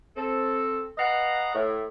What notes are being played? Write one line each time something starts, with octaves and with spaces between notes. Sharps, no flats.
C4 A4
B4 D#5 F5 F#5 A#5
A2